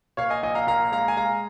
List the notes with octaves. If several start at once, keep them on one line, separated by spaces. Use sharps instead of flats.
A#2 C#5 F5
D#5 G#5
A#1 D#5 G#5
F5 A#5
A#2 F5 A#5
G#3 F5 A#5
G#5
G#3 F5 A#5